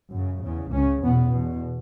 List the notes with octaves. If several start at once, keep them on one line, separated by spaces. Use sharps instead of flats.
F#2 C#3
E2 C#3
C#2 C#3 C#4
E2 B2 B3
E2 B2